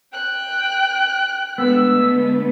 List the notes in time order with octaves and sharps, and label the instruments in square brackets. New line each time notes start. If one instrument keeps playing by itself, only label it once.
[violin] G5 F#6
[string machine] D3 G#3 A3 [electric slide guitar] B3 [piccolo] E6